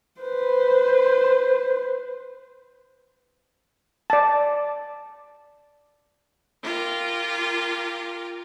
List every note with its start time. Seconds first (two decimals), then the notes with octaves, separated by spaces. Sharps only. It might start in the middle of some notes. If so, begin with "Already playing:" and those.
0.20 B4 C5
4.10 D5 A5
6.63 F4 G4 A#4